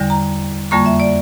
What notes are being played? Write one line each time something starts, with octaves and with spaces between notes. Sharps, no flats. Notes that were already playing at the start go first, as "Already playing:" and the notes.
Already playing: E2 D3 G3
A#5
F2 D3 G3 A#3 C#6
E5
D5